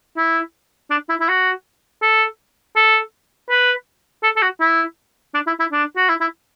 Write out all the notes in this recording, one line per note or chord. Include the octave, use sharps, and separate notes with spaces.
E4
D4
E4
E4
F#4
A4
A4
B4
A4
A4
F#4
E4
D4
E4
E4
D4
F#4
E4
E4